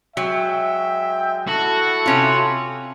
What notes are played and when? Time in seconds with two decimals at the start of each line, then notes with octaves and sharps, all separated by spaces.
0.17 F#3 G#3 E5 G5
1.47 E4 F#4 A4 A5
2.06 C3 C#4 F4